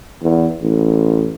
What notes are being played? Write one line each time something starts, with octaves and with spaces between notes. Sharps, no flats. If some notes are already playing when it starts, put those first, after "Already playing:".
E2
A1